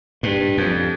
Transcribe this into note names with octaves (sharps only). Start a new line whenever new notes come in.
G2
F2